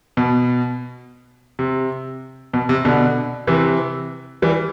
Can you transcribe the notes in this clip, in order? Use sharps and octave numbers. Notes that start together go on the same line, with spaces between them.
B2
C3
B2
C3
B2 D3
C3 E3
E3 G3